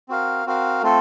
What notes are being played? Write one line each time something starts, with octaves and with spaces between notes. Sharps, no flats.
C4 F#4 A#4 F5
C4 F#4 A#4 F5
A3 C4 F4 A4